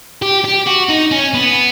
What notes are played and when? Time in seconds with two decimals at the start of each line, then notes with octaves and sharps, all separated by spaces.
0.22 G4
0.45 G4
0.67 F#4
0.89 D#4
1.11 C#4
1.34 B3